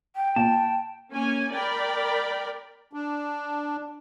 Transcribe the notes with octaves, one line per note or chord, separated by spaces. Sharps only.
G5
A#2 A#3 A5
A#3 C#4 G#5
A#4 D5 G5 B5
D4